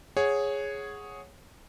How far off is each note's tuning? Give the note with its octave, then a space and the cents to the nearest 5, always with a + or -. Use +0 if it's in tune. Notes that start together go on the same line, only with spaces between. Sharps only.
G#4 +0 C#5 -5 F#5 -5